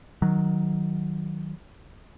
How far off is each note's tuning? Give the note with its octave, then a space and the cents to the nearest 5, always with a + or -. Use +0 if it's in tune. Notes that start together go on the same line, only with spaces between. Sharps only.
D#3 +5 F#3 +0